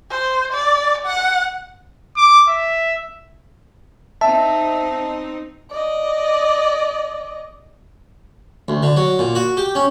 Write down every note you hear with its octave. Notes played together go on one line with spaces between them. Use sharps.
C5
D5
F#5
D6
E5
C4 D#4 E5 A5
D5 D#5
D2
D3
F#3
A#2
F#4
G4
C#4